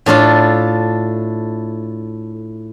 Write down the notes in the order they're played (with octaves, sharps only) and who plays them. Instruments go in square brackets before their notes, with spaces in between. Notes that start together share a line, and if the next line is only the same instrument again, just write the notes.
[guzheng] A2 D4 F4 A4